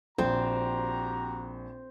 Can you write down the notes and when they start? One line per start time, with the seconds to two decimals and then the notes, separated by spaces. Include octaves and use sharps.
0.18 A#1 C4 F#4 G4 C5 A#5